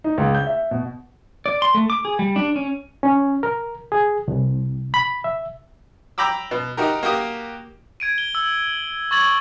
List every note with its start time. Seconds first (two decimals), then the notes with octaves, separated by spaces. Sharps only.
0.04 D#4
0.18 C#2
0.35 G6
0.47 E5
0.71 B2
1.46 D5
1.62 C6
1.74 A3
1.90 D6
2.05 G#4
2.19 G3
2.36 D4
2.56 C#4
3.03 C#4
3.43 A#4
3.92 G#4
4.28 C2
4.94 B5
5.24 E5
6.18 G5 A#5 B5 D6 E6
6.51 B2
6.77 D#4 F#4 G4 A#4
7.03 A#3 F#4 G4 D#6
8.00 G#6 D7 D#7
8.18 G7
8.35 E6
9.11 C#6 D6 G#6 A6 F#7